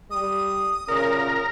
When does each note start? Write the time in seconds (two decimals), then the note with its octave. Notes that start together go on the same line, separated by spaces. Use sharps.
0.11 G3 D#6
0.88 F#2 A#2 C#3 A#4